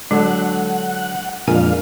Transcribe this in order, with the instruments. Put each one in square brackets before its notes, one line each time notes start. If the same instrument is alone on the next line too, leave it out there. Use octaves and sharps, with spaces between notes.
[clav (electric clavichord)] D3 F#3 A4 [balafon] G#3 [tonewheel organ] F#5
[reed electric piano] F2 A#2 G#3 [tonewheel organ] D4 F5 [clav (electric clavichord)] A#4 [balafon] G#5